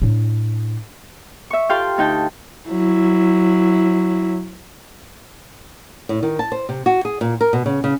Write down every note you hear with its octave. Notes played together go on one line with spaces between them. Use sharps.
A2 D4
E5 C#6
F4 G4 A4 F5 G5 C6
D2 D#4 G5 A5
F#3 E4
A2
D#3
A5
C5
C3
F#4
G#4
A#2
A#4
B2
C#3
C#3